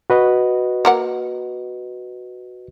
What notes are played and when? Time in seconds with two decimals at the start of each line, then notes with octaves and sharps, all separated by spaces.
0.10 F#4 B4 D#5
0.85 A#3 A#4 F#5